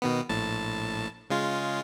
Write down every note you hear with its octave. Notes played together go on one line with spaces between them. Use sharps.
B2 D#3 B3
A#1 A2 A5
C#3 G#3 F4